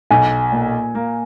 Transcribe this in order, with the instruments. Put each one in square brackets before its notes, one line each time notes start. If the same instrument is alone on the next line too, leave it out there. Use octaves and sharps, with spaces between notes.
[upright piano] B1 [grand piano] G#5
[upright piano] A#2
A#3